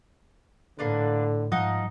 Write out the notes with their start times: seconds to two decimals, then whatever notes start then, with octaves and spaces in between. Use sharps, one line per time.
0.79 A2 D3 A#3 D4 B4
1.52 G#2 F3 D#4 D#5 F#5